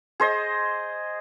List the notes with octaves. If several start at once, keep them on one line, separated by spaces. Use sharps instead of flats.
G#4 C5 D#5